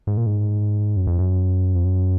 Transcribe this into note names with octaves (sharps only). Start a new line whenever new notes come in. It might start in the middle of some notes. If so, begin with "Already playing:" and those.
G#2
A#2
G#2
F#2
F2
F#2
F2
F#2